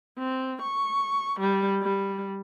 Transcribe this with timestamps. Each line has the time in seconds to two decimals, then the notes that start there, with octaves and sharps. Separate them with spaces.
0.18 C4
0.62 C#6
1.40 G3
1.82 G3